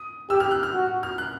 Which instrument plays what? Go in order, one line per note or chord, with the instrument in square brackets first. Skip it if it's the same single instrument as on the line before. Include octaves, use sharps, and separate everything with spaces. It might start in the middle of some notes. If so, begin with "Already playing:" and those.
Already playing: [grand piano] D#6
[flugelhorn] G4 [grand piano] E6
[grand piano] F6
F#6
F6
[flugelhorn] F#4
[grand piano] F6
F#6